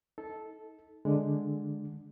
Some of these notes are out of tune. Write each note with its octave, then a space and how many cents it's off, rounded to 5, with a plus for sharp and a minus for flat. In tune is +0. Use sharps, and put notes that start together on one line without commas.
D#4 +35 A4 -10
D3 +0 G#3 +0